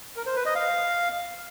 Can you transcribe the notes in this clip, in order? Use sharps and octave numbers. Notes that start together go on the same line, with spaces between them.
A#4
C5
B4
D#5
F5